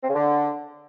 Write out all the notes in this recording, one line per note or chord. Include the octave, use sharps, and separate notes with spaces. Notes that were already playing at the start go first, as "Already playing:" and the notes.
C4
C#3
D3